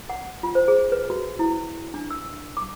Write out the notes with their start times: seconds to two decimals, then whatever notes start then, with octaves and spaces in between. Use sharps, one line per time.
0.10 F#5
0.43 F4
0.55 C5
0.68 G#4
0.92 B4
1.10 F#4
1.39 E4
1.94 D4
2.11 E6
2.57 D6